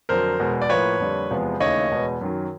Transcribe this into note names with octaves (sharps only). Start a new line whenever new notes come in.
F2 D3 F#3 A#4 C5
E2 B2 G#3
D5
A2 F3 A#3 B4 C#5
F2 D3 G3 A#3
E2 C3 F3 G#3 B3
D#2 C#3 E3 A3 C#5 D#5
E2 B2 G#3 B3
F#2 D#3 F#3